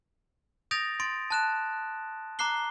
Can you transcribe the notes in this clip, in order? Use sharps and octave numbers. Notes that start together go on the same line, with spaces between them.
D#6 G6 A6 A#6 D7 F7
C6 A6 D7
A5 F#6 E7
A#5 D6 F#6 C7 G7